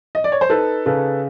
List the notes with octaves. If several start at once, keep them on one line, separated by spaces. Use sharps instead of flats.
D#5
D5
C#5
C5
D#4 A4 B4
C#3 A4 B4